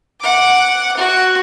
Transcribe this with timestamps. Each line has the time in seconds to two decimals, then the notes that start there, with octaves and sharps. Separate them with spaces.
0.21 F#5 D6
0.96 F#4